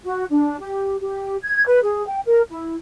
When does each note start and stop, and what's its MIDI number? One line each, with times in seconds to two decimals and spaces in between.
0.04 0.24 66
0.31 0.59 62
0.60 0.97 67
1.01 1.37 67
1.42 1.64 92
1.66 1.80 71
1.82 2.04 68
2.07 2.20 79
2.25 2.41 70
2.50 2.76 64